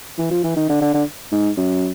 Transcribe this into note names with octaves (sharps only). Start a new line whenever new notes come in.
E3
F3
E3
D#3
D3
D3
D3
G#2
F#2